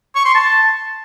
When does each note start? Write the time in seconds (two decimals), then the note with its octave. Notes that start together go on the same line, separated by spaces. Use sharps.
0.15 C#6
0.25 C6
0.35 A5